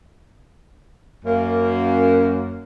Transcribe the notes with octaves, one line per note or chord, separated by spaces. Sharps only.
F#2 A#3